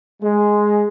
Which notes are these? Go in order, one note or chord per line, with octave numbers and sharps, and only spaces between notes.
G#3